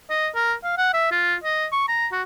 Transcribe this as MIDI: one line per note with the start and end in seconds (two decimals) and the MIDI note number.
0.10 0.28 75
0.35 0.53 70
0.63 0.74 77
0.77 0.90 78
0.93 1.09 76
1.11 1.35 65
1.44 1.66 75
1.72 1.83 85
1.88 2.07 82
2.12 2.22 66